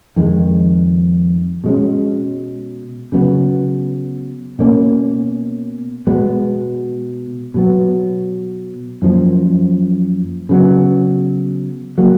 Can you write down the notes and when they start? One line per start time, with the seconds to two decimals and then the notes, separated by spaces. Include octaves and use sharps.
0.16 F2 D#3 G#3
1.64 B2 G#3 C#4
3.12 C#3 F#3 B3
4.59 B2 A#3 C#4
6.07 B2 G#3 B3
7.54 B2 F#3 B3
9.02 F#2 F3 A#3
10.49 C#3 F#3 B3
11.98 F#3 A#3